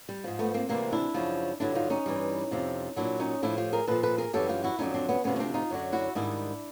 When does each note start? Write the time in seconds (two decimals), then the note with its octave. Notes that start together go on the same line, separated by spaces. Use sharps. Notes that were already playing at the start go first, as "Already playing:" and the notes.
0.09 G3
0.24 G#2 F3
0.39 A3 B3
0.54 A#3 C4
0.69 D2 C3 E3 G3 A#3 C4
0.92 D4 E4
1.14 F#2 C#3 F3
1.60 G2 D3 F#3 D4 E4
1.75 D#4 F4
1.90 C#4 D#4
2.06 G2 E3 G3
2.51 F2 C3 F3
2.96 A#2 F#3 D4 E4
3.20 C#4 D#4
3.42 A2 F3 D4 E4
3.57 F4 G4
3.73 G#4 A#4
3.87 A#2 F3 A4 B4
4.03 A4 B4
4.18 G#4 A#4
4.33 F#2 C#3 E3 G3 G4 A4
4.49 F4 G4
4.64 E4 F#4
4.79 F2 D3 F#3 C#4 D#4
4.94 C4 D4
5.09 B3 C#4
5.24 D2 C3 F3 B3 C#4
5.36 C#4
5.40 C4 D4
5.54 D#4 F4
5.70 F#2 D3 F#3
5.92 E4 F#4
6.15 G#2 D#3 G3 D4 E4